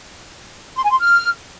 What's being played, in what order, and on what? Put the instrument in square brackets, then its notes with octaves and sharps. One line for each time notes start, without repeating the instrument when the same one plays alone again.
[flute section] C6
G#5
C6
F6